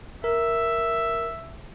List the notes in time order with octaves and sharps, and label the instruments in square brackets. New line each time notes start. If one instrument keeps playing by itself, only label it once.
[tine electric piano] A#4 [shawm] E5